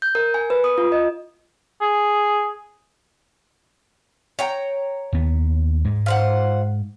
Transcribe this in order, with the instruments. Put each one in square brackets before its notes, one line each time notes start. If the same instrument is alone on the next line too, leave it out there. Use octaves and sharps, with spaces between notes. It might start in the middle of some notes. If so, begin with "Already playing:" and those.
[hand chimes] G6
A#4
G#5
B4
D#6
F4
D#5
[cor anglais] G#4
[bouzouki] C#5 G5 A#5
[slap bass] D#2 B3
G#2 G#3
[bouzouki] F4 C5 F#5